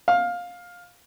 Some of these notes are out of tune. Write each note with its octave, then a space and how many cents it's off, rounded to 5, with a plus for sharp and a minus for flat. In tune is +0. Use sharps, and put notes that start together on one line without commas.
F5 +15